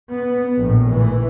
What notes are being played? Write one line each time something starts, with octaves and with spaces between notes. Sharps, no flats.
B3
A#1 A2
E3